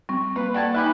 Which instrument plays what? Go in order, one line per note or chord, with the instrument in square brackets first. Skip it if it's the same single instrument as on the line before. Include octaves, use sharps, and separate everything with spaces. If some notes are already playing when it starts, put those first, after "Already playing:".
[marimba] G3 C4 [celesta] C#6
[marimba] A#3 [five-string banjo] F4 [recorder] B4
[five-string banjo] F#4 A4 A5 [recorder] D5 [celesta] F#5 [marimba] G5 C#6 G#6
[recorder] D#4 [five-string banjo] G4 B4 E5 [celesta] G#5 F#6